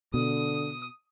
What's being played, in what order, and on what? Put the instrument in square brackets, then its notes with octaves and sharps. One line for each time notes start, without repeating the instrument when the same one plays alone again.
[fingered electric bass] B2 [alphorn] D3 [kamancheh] D#6